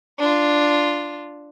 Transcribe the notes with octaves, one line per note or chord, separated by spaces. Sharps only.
D4 F4